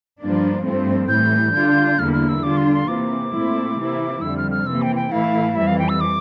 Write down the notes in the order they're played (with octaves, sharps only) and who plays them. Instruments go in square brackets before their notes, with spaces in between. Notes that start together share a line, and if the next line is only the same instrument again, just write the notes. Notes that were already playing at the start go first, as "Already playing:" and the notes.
[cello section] G2 F3 A#3 D4
G2 F3 A3 C4
[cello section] A2 E3 G3 [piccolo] G6
[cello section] D3 G3 D4 F4
[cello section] E2 D3 G3 A#3 E4 [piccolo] F6
[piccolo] F6
E6
[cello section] D3 G3 D4 F4 [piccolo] D6
[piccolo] C6
C6
[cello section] C3 E3 A#3 [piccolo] D6
[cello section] A#2 A3 C4 E4
C3 E3 A#3 E4
[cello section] F2 D3 G3 [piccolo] E6
[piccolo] F6
F6
[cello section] C3 E3 A#3 [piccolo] E6
[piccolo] G5
G5
[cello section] A2 E3 A3 E4 [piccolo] F5
[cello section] F2 E3 G3 [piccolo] E5
[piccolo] F5
G5
E6
D6